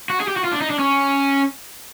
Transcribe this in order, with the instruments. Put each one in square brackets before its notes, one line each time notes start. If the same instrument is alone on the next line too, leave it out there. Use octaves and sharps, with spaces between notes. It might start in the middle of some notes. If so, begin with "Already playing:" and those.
[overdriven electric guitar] F#4
G#4
G4
F#4
F4
D4
D#4
D4
C#4